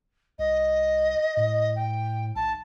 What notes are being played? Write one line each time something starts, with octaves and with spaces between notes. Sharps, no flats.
C2 D#5
A2
G5
B1 A5